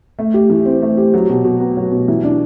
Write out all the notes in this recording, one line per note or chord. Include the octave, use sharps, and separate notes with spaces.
A3
G4
E3
C4
A3
G4
F#3
B2
B2
B3
F#3
B2
E3
D4